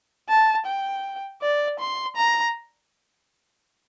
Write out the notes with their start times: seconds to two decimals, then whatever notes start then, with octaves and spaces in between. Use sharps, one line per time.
0.29 A5
0.66 G5
1.42 D5
1.80 C6
2.17 A#5